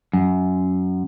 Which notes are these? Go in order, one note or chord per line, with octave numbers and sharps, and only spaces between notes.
F#2